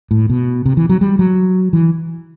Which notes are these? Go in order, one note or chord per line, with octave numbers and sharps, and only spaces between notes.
A2
B2
C3
E3
F#3
G3
F#3
E3